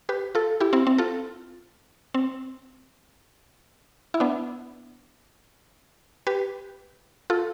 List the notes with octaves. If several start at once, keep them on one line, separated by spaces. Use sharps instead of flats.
G4 B4
F4 A4
E4 G4
C4 E4
C4
F4 A4
C4
E4
B3 D4
G4 B4
F4 A4